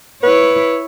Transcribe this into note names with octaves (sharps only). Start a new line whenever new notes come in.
E4 B4 C#5